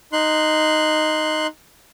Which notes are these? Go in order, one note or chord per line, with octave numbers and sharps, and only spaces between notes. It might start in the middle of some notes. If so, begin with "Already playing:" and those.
D#4 C6 F#6